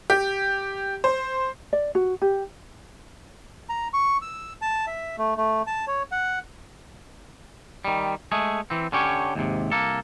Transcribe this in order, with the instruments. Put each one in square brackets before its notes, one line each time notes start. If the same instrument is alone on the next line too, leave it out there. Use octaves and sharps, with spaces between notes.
[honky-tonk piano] G4
C5
[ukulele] D5
F#4
G4
[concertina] A#5
C#6
E6
A5
E5
A3
A3
A5
C#5
F#5
[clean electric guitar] D#3 G3
G#3 A3 G#4
E3 C4
D3 C#4 G4 C#5
D#2 G#2 C3
C2 A#3 A4